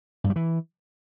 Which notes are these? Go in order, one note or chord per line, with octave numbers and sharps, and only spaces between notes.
G2
G3
E3